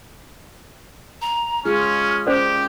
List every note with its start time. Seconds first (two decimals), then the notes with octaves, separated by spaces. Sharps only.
1.22 A#5
1.65 G#3 C#4 F4 G#4 F6
2.27 C#4 G4 A#4 C5 D5